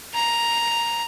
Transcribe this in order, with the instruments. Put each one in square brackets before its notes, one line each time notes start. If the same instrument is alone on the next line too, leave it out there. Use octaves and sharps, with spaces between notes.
[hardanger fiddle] A#5